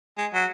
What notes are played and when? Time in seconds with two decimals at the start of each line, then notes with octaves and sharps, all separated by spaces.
0.18 G#3
0.34 F#3